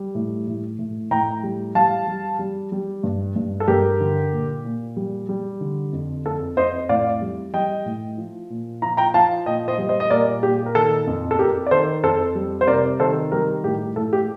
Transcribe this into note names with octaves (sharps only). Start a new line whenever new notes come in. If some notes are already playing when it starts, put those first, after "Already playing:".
Already playing: G3
A2
A2
A2
A2 G5 A#5
G3
G3 F5 A5
G3
G3
G3
G2
G2
A4
G2 G4 A#4
D3
A#2
A#2
G3
G3
D3
F2
F2 A4
F2 C5 D#5
A2 D5 F5
G3
G3 D#5 G5
A2
F3
A#2
F3 A#5
G5 A#5
F3 F5 A5
A#2 D#5 G5
C5 D#5
G3
C5 D#5
D#5
A#2 A#4 D5
A#2 G4
A#4
D#3 A4
F2
A4
F2 G4 A#4
D5
D#3 A4 C5
F2 A4 C5
G3
C5
C3 A#4 D5
D#3 A4 C5
G3 G4 A#4
A2 G4
A2 A4
G4